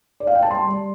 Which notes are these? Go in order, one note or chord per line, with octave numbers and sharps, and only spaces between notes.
D5
F5
G5
A5
G3 C6
G3